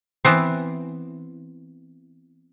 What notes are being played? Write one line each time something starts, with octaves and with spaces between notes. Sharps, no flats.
E3 B3 C4